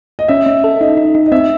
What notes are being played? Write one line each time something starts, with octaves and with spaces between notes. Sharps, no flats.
D#5
C#4 E5
C#4
A4
D#4 D#5
D#4
D#4
D#5
C4 E5